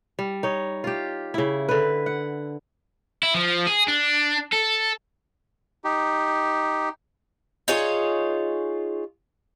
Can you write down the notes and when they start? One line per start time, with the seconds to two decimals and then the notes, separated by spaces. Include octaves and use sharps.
0.19 G3
0.43 D#4 C#5
0.84 F4 G4
1.34 C#3 E4
1.69 D3 B4
2.06 F#5
3.23 E4
3.35 F3
3.67 G#4
3.88 D4
4.52 A4
5.84 D#4 G4
7.68 D#4 F4 G#4 C#5